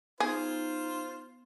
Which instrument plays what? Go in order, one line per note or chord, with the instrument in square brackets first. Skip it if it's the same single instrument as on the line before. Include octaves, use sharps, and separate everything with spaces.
[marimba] B3 [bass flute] D#4 [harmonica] F4 C5 [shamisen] G#4